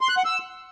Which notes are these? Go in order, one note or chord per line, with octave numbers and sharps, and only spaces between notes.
C6
F#6
F#5
E6